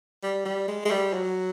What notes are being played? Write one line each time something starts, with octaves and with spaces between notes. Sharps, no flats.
G3
G3
G#3
G#3
G3
F#3